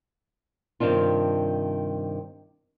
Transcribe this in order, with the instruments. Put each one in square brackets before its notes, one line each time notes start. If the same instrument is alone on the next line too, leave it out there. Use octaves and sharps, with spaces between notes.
[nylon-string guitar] G2 C3 D#3 D4 F4